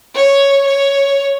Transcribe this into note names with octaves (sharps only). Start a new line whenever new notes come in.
C#5
C#5